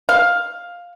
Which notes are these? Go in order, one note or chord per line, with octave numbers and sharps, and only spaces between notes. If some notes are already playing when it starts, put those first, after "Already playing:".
F5